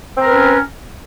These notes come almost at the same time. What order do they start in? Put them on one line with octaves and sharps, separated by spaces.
C4 A#4 B4 C#4